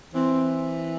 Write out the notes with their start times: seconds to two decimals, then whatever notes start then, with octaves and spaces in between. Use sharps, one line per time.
0.14 E3 C4